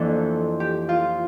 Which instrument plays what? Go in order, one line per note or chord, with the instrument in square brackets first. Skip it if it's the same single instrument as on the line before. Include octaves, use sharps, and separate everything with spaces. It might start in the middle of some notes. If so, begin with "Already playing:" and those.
Already playing: [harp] F2 E3 A#3 D4 A4
G4
F4